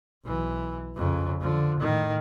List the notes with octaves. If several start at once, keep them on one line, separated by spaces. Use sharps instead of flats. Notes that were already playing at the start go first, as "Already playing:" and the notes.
B1 E3
F2 C#3
D3 F3
A2 D#3